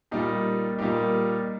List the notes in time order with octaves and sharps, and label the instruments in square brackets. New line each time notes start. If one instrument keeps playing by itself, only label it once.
[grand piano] A#2 G3 A#3 D#4 G4
A#2 G3 A#3 D#4 G4